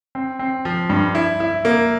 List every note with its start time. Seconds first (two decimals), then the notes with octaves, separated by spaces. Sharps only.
0.15 C4
0.39 C4
0.65 F3
0.89 G2
1.15 E4
1.40 E4
1.65 A#3